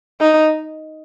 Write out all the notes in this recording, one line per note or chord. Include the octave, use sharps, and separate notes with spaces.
D#4